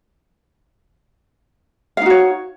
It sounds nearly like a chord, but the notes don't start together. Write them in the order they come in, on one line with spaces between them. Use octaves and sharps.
F5 D#4 F#4 C#5